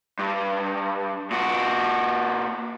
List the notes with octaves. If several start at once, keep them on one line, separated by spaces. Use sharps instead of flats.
G2
A#2 F#4